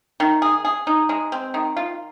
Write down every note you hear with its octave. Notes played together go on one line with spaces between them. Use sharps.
D#3
G#4
G#4
D#4
G#3
C4
D#3
F4